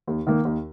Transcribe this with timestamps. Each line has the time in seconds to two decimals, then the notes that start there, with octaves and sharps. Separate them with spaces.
0.07 D#2
0.27 D#3 A#3
0.45 D#2